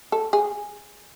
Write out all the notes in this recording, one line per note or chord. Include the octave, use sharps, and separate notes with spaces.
A4
G#4